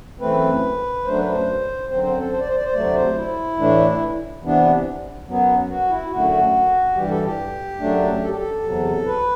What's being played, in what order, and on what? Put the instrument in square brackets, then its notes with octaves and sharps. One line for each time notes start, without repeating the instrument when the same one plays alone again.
[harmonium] F#2 E3 A3 C4 B4
F#2 F#3 A3 D4 C5
B4
C5
F#2 D3 F#3 C4 C5
C5
A4
C5
D5
C5
D5
C5
D2 C3 F#3 A3 D5
C5
E4
A2 E3 A3 D4
C3 E3 B3 D4
F#2 F#3 B3
F#4
E4
F#2 D3 A3 F#4
G2 E3 G3 G4
A4
G4
F#2 F#3 A3 D4
A4
G4
A4
E2 C3 F#3
B4